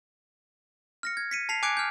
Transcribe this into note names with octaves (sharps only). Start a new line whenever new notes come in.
F6 A#6 C#7
G#6
B6 C#7 D#7
A5 B6 C7 F7
G#5 D6 F#6 G#6 C#7 D7
F6 G6